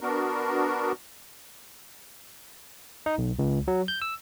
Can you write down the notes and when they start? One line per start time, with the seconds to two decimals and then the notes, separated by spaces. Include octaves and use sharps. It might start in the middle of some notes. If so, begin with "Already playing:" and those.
0.01 B3 D4 F#4 A#4
3.06 D#4
3.18 B1
3.39 C#2
3.68 F#3
3.88 G6
4.02 E6